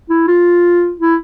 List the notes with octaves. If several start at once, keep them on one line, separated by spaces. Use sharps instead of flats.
E4
F4
E4